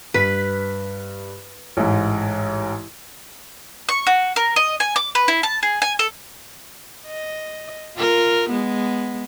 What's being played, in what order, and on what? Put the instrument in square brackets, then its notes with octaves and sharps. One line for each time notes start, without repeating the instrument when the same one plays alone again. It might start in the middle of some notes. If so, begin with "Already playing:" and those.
[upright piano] G2 B6 [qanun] B4
[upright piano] A1 G#2
[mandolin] C#6
F#4
A#4
D#5
G#5
D6
B4
E4
A5
G#4
G#5
A4
[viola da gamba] D#5
F4 A#4
G#3 B3